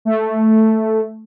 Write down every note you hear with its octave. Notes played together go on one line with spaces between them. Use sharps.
A3